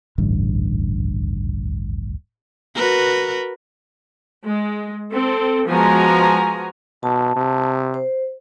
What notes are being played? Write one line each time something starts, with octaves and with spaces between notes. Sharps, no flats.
D#1 A1 D2 G2
F#4 A#4 B4
G#3
C4 A4
F3 G#3 B3 F#4 G#5 A#5
B2 A5
C3
C5